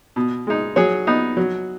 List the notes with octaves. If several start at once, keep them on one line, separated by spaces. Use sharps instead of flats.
B2
G#3 D#4
F#3 G#4 C#5
B3 D#4
F#3